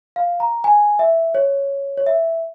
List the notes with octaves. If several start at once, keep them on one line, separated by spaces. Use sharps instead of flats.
F5
A#5
G#5
E5
C#5
C#5
E5